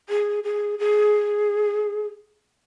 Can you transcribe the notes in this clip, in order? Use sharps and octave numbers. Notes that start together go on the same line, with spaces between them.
G#4
G#4
G#4